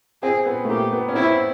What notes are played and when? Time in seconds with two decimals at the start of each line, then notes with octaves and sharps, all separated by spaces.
0.23 C4 G#4
0.46 B3
0.65 A3
0.69 A#3 G4
0.93 B3
1.09 C#4
1.15 C4 E4